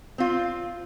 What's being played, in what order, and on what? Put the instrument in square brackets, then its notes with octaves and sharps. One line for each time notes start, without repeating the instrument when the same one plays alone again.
[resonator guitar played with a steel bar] C4 F4